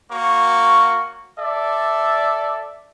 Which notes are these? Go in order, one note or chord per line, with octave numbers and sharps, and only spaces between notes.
A#3 F#4 C#5 C#6
A4 D5 E5